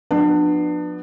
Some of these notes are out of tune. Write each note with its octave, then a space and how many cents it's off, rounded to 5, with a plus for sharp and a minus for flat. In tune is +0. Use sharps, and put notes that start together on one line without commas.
F3 +40 B3 +0 D4 +25